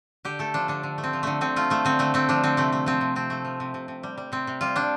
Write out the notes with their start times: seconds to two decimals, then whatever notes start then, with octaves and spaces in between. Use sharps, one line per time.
0.25 D3 G4
0.39 A3 A4
0.54 F3 D4
0.68 D3 D4
0.83 D3
0.98 A3
1.04 C4
1.13 F3
1.23 D3 A3
1.41 D3 C4
1.56 A3 F4
1.70 F3 A3
1.85 D3 C4
1.99 D3 A3
2.14 A3 C4
2.29 F3 D4
2.44 D3 C4
2.57 C3 A3
2.72 A3
2.86 F3 C4
3.01 C3
3.16 C3 C4
3.30 A3
3.45 F3
3.60 C3
3.74 C3
3.88 C3
4.03 G3
4.18 G3
4.32 C3 C4
4.47 C3
4.61 G3 F4
4.76 G3 D4